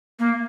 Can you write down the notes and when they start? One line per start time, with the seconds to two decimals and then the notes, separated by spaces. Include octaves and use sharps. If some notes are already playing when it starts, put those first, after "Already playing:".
0.19 A#3